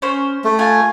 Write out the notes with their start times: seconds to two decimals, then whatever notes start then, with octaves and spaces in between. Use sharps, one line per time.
0.02 C#4 C5
0.44 A3
0.59 F4 G#5